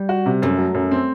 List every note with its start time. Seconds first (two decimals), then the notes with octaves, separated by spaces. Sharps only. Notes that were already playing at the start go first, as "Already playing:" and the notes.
Already playing: G3
0.09 F#4
0.26 C3
0.42 F#2 A3
0.58 F#3
0.74 F#2
0.91 C4